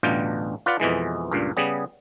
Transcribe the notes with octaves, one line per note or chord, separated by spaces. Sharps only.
A1 D2 B2 G3 F4 G5
F4 B4 D5 F#5
F2 B2 E3 G#3
C#2 G2 A#2
C#3 G3 B3 G#4